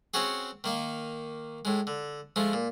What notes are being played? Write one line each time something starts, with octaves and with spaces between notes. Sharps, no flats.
C4 C#4 F#4 G#4
D#3 A#3 D#4
A2 G#3
D3
F3 G#3 A3
A#2